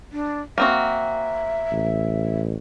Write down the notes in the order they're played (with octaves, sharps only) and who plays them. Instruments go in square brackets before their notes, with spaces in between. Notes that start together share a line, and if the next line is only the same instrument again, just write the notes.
[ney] D4
[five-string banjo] A#3 C4 F#4 [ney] E5
[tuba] A1